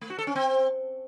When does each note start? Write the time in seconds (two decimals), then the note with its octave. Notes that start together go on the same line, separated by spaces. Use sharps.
0.01 A3
0.10 F#4
0.18 A4
0.27 C#4
0.35 C4